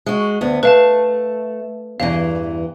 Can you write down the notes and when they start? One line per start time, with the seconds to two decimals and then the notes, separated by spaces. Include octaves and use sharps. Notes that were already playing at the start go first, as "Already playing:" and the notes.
0.06 G#3 F#4
0.41 D2 B3
0.63 A3 B4 F5 A5
2.00 E2 G2 E3 F5